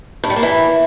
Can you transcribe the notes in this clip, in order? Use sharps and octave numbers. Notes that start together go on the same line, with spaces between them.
G2
G3
A#3
E3